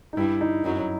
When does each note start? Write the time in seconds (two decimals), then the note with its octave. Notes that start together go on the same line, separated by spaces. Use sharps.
0.13 D#4
0.17 G2 G3 E4
0.41 D#4
0.64 F#2 F#3 D#4